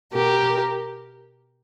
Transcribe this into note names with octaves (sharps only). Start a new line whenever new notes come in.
B2 G4 A#4